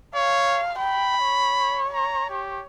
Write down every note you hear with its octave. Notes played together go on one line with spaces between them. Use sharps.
C#5 F5
G5 B5
C#5
A#5
G4